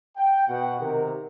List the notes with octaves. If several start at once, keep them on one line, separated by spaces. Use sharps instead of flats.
G5
B2 F#5
C3 D#3 G4 A#4